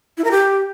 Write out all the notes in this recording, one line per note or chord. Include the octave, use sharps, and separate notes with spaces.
E4
A#4
G4